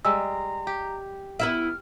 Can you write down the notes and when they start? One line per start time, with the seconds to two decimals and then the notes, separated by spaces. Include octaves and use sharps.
0.05 G3 G#3 A#5 E6
0.67 G4
1.39 B3 E4 E5 F6